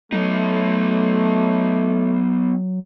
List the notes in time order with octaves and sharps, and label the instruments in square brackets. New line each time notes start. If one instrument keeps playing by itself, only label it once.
[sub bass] F#3 [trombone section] A3 [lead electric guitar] B3 D#4